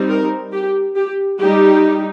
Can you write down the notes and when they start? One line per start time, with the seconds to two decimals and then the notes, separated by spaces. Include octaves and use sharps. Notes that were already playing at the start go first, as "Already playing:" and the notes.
Already playing: G3 C4 D#4
0.09 A#4
0.52 G4
0.96 G4
1.40 G3 D#4 G4